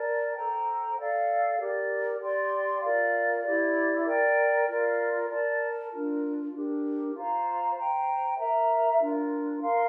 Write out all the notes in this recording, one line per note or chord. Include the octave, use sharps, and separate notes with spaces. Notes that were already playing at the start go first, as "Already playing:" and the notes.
Already playing: A#4 D5 A5
A4 C5 G5 A#5
A4 D5 F5
G4 A#4 D5
G4 D5 G5 C6
F4 A#4 D5 F5
E4 G4 D5
A#4 D5 G5
F4 A#4 D5
A#4 D5 A5
D4 F4 A#4
D4 G4 A#4
F4 C5 F5 A#5
C5 G5 A#5
A#4 E5 A#5
D4 F4 A#4
A#4 F5 C6